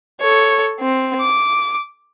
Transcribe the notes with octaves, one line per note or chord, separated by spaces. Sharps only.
A4 C#5
C4
D6